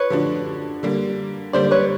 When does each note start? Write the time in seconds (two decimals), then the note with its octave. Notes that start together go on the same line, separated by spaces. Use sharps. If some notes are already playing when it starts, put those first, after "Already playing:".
Already playing: F3 B4 C#5
0.10 D3 F3 A3 D4 F#4
0.83 D3 G3 A#3
1.53 D3 G3 A#3 C5 D5
1.71 B4 C#5